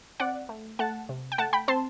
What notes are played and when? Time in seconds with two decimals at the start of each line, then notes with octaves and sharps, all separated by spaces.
0.20 C4 D5 F#5
0.49 A3
0.79 A3 F#5 A5
1.09 C3
1.32 G5
1.38 A3 F#5 A5
1.53 G5 B5
1.68 C4 A5 C6